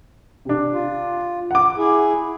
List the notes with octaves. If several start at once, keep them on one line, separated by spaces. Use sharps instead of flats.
C3 D4
F4
F#5 D6
E4 G#4